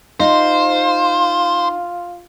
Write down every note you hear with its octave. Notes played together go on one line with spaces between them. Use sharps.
D#4 F4 C5